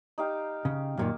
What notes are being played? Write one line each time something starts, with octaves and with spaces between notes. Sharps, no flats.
D#4 G4 F5
C#3
F#2 A#2 D#3 A#3